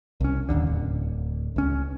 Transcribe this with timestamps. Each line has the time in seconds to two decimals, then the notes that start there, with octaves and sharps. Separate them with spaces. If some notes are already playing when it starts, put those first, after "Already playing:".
0.20 C2 C#4
0.49 D#1 A#1 D#2 D3
0.67 D1
1.56 C#2 C#4